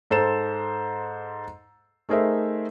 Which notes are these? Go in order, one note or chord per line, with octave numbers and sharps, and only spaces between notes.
G#2 A4 C5 E7
A3 D#4 G#4 A#4 C5 E5